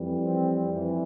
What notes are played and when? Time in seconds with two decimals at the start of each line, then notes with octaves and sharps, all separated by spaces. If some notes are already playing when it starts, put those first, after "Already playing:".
Already playing: F2 E3 G3
0.21 C4
0.71 F2 E3 G3